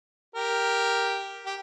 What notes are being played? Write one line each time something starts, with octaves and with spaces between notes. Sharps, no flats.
G4 A#4
G4